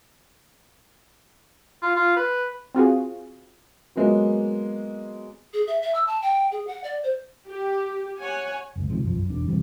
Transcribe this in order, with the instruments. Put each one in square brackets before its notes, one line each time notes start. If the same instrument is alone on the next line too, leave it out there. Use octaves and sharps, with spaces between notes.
[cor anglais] F4
F4
B4
[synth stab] C4 F4 F#4 G#4
[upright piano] F#3 G#3 A#3 B3 F#4
[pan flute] G#4
E5
E5
E6
A5
G5
G#4
F#5
D5
C5
[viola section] G4
C#5 F#5 G#5
[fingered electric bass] F#1 C#2
C3 D#3 F3 G#3
B1 F#2 F3
F#2
E1 D4
A#1 C3 E3 G3